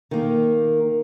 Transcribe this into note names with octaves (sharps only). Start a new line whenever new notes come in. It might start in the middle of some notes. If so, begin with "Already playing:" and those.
D#3 A#3